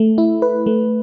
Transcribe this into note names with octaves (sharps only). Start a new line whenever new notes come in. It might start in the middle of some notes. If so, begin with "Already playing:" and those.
Already playing: A3
E4
B4
A3